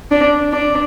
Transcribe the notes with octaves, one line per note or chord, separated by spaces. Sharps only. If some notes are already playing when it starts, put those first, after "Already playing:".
D4
D4